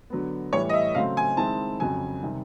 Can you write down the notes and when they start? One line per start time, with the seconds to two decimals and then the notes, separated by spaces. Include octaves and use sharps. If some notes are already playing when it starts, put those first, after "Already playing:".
0.10 D3 F#3 B3
0.53 A2 E3 G3 C#5
0.69 D#5
0.74 E5
0.95 C#3 F#3 A3 C4 F5
1.17 G#5
1.37 D#3 G#3 C4 E4 A5
1.80 F2 C#3 F#3 G#5
2.23 C3 D#3 G3